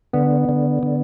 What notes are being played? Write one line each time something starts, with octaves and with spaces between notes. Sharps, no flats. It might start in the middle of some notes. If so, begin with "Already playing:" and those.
D3 B3
D3
D3